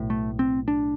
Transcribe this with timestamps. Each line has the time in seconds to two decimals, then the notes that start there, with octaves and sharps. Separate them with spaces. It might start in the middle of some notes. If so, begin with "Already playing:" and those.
Already playing: B1 A2
0.10 A3
0.39 C4
0.68 D4